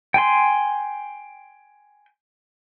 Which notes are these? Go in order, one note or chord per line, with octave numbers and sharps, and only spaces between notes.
G5 G#5 C6